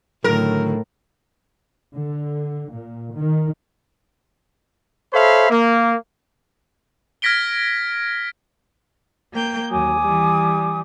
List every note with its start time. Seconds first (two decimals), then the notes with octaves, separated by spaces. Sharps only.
0.24 A2 D3 D#3 F#3 A#4
1.96 D3
2.73 A#2
3.14 D#3
5.14 A4 C5 C#5 E5 F5 B5
5.50 A#3
7.22 F6 G#6 A#6 B6 D7 G7
9.33 A#3 G5 G6
9.70 D#2 F#3 G#5 D6 D#6
10.00 E3 G3